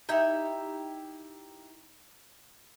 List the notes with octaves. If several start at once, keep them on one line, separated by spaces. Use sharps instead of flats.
D#4 E4 G4 E5